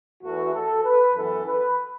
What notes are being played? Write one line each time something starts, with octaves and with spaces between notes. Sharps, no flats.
E2 E3 A3 F#4
A4
B4
F#2 E3 B3 A4
B4